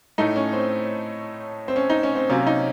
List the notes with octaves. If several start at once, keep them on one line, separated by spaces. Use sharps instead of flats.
A2 A3 D#4
C#4
C4
C4
C#4
D#4
C#4
C4
C3 F#3 A#3 C#4
D#4